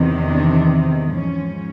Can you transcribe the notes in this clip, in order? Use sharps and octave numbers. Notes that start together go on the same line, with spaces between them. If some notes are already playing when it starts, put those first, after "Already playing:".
Already playing: E2 C3 D#3
D4
G#2 F3 C#4